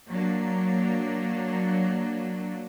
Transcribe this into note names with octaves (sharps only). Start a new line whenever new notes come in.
F#3 A#3 D4